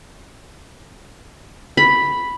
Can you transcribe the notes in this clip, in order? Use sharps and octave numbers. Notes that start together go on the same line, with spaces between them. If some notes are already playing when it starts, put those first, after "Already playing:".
B5